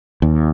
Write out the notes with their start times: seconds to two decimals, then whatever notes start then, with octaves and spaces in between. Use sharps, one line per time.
0.22 D#2